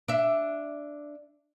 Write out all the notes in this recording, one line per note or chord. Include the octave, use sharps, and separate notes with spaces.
D4 E5